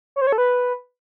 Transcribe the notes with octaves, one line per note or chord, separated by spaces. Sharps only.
C#5
C5
C#5
A4
B4